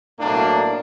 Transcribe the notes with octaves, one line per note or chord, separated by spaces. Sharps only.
B1 A2 A#3 D4